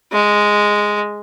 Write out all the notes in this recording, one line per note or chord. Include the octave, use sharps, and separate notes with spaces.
G#3